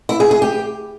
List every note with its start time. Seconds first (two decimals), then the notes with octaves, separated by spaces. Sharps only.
0.09 E4
0.20 G#4
0.31 G#4
0.42 G4